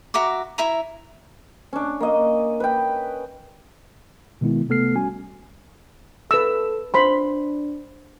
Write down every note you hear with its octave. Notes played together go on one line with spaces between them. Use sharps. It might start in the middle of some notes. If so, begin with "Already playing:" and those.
F#4 E5 A#5 D6
E4 E5 A#5
C#4 D4
A#3 D#5
B4 G5
B2 D#3 G#3 B3 E4
C3 A3 B3 A4 F6 C7
A#1 G3 C#4 F#4 G#5
A4 B4 E6
D4 C5 B5 C6